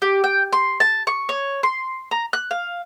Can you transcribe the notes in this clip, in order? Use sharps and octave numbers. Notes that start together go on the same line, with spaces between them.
G4
G5
C6
A5
C#6
C#5
C6
A#5
F#6
F5